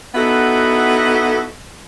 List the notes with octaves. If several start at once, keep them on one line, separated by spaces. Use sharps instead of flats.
B3 D#4 E4 F#4 A4